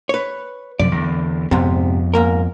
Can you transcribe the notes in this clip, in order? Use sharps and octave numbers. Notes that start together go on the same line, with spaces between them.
B4 C#5
F#2 C3 F3 D5
E2 D3
F2 G#2 C3 B3
G#2 A#3 A#4